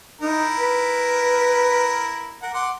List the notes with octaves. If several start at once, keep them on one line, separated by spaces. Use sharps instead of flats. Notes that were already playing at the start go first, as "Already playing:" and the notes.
D#4 E4 A#4
B4
A#4 F#5
F#5 C6 D6